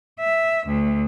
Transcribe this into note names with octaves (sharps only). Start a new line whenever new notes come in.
E5
D2